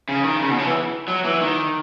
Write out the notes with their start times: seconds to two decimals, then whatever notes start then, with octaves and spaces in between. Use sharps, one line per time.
0.09 C#3
0.24 D#3
0.41 C#3
0.50 B2
0.58 C#3
0.66 E3
1.08 F#3
1.25 E3
1.41 D#3